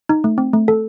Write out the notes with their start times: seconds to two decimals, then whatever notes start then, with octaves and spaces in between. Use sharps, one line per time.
0.09 D#4
0.24 A3
0.38 C4
0.53 A3
0.68 A4